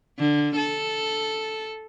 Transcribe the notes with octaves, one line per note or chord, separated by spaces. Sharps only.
D3
A4